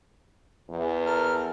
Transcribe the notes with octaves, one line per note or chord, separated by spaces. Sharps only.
E2
A4 A#4 F6